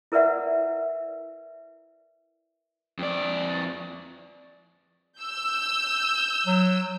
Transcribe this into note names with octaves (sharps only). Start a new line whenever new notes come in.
E4 A#4 B4 D5 E5 F#5
F2 D5
E6 G6
F#3